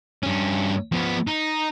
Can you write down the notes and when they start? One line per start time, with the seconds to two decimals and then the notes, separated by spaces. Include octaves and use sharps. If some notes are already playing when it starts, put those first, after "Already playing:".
0.23 G2 C#4
0.92 F3 B3
1.27 D#4